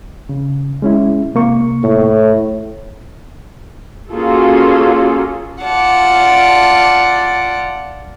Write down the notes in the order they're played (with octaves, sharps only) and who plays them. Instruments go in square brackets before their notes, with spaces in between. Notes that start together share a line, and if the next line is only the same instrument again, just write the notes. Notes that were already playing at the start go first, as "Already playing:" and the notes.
[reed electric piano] C#3
G#3 C#4 E4
C3 A#3 C#6
[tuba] A2
[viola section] A#3 C#4 F4 F#4 G#4 A4
[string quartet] F4 D5 F#5 A5